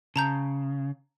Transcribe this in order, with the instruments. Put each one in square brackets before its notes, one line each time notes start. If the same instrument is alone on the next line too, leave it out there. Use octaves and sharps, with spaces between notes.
[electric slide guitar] C#3 [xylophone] A5 A#5 G6